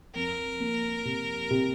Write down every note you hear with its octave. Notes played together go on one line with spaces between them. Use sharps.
F2 A#4
A#3
C3
C3